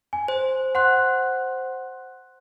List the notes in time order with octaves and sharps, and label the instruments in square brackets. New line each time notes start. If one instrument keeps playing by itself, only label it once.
[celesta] G#5
[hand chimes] C5
[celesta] F#5 C6 F#6